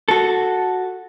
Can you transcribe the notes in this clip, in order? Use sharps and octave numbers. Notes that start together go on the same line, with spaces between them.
F#4 A4